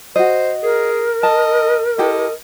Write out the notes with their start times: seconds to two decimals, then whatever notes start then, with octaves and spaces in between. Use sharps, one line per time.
0.16 F#4 C5 D#5
0.63 G#4 A#4
1.23 D#5 A5
1.98 E4 G4 A4 D#5